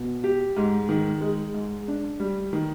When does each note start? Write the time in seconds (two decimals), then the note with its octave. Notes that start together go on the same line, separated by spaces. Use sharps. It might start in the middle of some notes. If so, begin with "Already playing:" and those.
Already playing: B2
0.24 G4
0.56 G#2
0.89 D#3
1.21 G#3
1.54 G#2
1.88 D4
2.20 G3
2.53 D#3